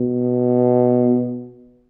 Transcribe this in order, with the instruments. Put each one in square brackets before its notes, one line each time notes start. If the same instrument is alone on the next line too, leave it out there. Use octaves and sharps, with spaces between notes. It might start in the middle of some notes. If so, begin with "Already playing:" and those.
Already playing: [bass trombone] B2